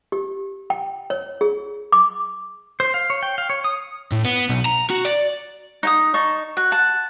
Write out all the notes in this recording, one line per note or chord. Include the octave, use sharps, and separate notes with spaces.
G4
G5
C#5
G#4
D6
C5
F5
C#5
G5
F5
C#5
D#6
A2
B3
B1
A#5
F#4
D5
D#4 G5 D#6
D#4 A5 C#6
F#4
F#5 A5